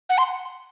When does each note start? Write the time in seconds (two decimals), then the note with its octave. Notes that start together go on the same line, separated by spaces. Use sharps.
0.10 F#5
0.18 C6